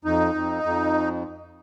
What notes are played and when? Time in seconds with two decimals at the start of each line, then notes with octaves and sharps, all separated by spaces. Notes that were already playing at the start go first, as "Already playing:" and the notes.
0.05 F2 D#4
0.34 F2
0.63 F2